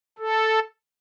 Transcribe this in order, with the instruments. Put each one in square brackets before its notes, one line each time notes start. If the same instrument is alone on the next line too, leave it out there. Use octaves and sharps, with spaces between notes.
[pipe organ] A4